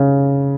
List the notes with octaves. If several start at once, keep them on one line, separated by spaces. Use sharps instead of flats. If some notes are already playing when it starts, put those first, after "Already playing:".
Already playing: C#3